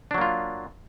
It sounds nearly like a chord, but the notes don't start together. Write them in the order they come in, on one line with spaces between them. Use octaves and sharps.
D4 F#3 A#3 F4